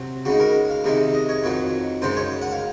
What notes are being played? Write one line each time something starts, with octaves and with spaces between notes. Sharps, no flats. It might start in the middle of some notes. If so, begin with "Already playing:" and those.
Already playing: C3 F#3 C4
C#3 G#3 D#4 F#4
A#4
F5
C3 D#3 G#3 D#4
D#5
C#5
F2 D#3 F#3
F#2 C#3 G#3 D#4 C5
C#5
F#5
F5